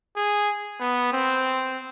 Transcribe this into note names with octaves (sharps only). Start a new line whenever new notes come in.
G#4
B3
C4